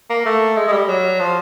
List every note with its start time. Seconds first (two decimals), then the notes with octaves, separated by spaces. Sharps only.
0.10 A#3
0.25 A3
0.57 G#3
0.68 G#3
0.72 G3
0.89 F#3
1.20 F3